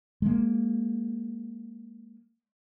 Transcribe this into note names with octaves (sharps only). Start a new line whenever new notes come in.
G#3 A#3